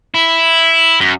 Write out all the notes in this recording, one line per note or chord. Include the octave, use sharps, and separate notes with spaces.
E4
F#2